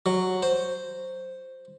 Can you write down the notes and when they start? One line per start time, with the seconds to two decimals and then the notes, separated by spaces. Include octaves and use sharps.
0.06 F#3
0.43 C5